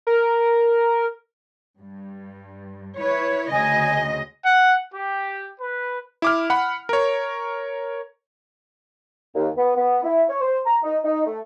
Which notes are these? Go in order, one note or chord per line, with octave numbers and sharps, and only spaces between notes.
A#4
G2
E4 B4 C#5
D2 C#3 D#5 G#5
F#5
G4
B4
E4 D6 F6
F#5 B5
A#4 C#5
D#2
B3
B3
E4
C#5
C5
A#5
D#4
D#4
A3